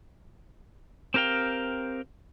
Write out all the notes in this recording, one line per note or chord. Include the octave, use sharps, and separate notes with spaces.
C4 G4 A#4 F5 G5